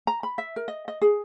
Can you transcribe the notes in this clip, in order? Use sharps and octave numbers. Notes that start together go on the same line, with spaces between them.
A#5
B5
E5
A#4
D#5
D#5
G#4